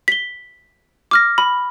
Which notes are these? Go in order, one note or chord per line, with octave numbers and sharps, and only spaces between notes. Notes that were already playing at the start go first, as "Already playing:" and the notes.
B6 G7
D6 F6 A#6
B5